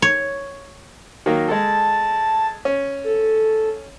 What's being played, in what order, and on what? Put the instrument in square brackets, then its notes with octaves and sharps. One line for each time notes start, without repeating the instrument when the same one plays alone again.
[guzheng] C#5
[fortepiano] D#3 F#3 A#3
[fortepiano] G#3 A4 [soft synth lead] A5
[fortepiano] C#4
[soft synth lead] A4